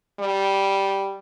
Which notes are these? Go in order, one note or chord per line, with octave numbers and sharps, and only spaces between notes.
G3